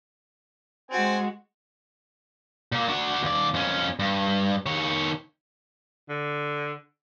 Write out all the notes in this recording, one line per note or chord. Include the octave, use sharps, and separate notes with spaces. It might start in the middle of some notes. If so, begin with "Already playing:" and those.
G#3 C4 F#4 G#5
A#2 A#3
D4 F#4
D#2 D5
F2 C#4
G2
D#3 C#5
D3